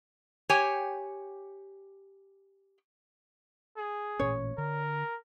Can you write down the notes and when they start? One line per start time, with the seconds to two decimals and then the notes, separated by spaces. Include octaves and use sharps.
0.49 G4 C#5 G5 G#5
3.78 G#4
4.20 A1 A#2 C#4 C#5
4.58 D3 A#4